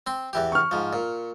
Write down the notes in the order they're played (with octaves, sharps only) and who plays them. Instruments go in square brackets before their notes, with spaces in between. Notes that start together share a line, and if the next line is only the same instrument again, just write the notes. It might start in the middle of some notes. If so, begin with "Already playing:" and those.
[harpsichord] C4 C6
E2 E3 G4
[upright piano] C#6 F6
[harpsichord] G#2 F3
A#2